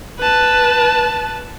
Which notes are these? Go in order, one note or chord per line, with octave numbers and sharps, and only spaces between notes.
B4 A5